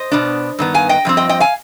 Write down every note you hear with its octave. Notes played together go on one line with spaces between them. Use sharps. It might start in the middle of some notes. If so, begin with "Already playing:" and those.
Already playing: C5 D#5
B2 B3 D4
G2 D#3 B3
F5 G#5
D#5 G5
G2 F3 C4
D#5 G5
D#5 G5
F5 G#5